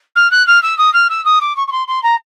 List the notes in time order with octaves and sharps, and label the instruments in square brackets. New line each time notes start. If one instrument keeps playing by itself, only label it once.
[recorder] F6
F#6
F6
E6
D#6
F6
E6
D#6
D6
C#6
C#6
C6
C6
A#5